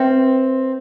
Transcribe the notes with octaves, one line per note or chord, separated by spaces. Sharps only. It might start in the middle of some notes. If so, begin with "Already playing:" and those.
Already playing: C4 B4 E5 G5